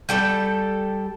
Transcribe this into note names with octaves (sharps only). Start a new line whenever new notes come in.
G3 A4 G5